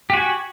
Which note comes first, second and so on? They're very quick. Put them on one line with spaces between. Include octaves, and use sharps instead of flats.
G4 F#4 G#5